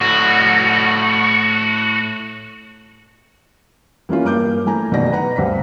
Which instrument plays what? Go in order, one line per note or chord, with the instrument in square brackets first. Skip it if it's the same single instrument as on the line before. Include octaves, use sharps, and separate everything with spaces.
[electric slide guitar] A2 F#4
[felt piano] E3 A#3 C#4 F4
G2 A#3 D6 G6
E3 A3 G#5 A#5
F#1 B2 D#3 D5 A#6
B4 F#5 A#5
D2 G2 C4 B6